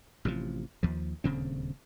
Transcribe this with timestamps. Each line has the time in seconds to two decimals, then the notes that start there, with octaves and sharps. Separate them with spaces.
0.25 A1 C3 D#3 F3
0.83 D#2 F3
1.24 D#1 D2 C#3 C4